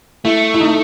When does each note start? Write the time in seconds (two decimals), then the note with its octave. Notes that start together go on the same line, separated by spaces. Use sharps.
0.25 A3 E4
0.54 E4
0.61 D#4